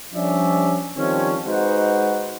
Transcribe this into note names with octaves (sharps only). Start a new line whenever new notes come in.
F3 G3 C#4 D4 D5 E5
D#3 F3 G3 C4 C#4
G#3 D#4 F#4 B4 C5 F#5